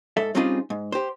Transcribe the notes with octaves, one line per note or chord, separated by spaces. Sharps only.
G#2 A4 E5
G3 C4 C#4 D#4 F4 G#4
G#2
G4 C5